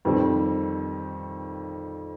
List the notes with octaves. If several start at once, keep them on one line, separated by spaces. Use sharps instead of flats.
F2 D#3 G3 C4